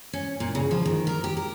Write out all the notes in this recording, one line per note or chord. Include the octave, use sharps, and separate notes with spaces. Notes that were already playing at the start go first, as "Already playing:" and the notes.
C#4
A#2
C#3
F3
D#3
A#4
G4
A#4